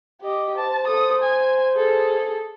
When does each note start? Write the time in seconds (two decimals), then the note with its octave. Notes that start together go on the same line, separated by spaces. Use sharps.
0.22 G4 D#5
0.57 C5 A5
0.87 A4 D#6
1.23 G#5
1.74 G#4 A4